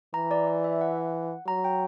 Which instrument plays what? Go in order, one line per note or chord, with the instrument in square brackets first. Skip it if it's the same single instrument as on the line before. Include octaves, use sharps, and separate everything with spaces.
[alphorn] E3 [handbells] A#5
[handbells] D5
D5
E5
F#5
[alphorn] F#3 [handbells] A#5
[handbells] G5